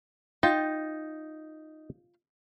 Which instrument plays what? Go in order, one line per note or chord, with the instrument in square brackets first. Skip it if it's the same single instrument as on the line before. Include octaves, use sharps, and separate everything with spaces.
[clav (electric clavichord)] D#4 [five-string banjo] F4 G5 A5